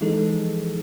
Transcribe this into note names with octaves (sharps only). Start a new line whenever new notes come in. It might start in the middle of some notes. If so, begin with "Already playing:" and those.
E3 F3 G#3 D#4 G#4 A4